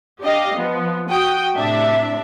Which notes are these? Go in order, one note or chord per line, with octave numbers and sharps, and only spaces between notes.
D4 G4 D#5 F5
F3 B3
F#4 G5 D#6
A2 C3 D4 E5